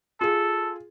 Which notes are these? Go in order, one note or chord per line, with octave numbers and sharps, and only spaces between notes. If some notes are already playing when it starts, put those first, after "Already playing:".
F4 G#4 A4